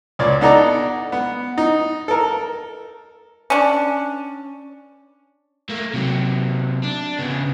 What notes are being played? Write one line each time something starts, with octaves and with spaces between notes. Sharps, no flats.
C#2 A#2 C#5 D5
B3 D4 D#4 A4 D5 A#5
B3
D#4
A4 A#4
C#4 D4
A3 A#3
C3 F#3
D4
C#3 B3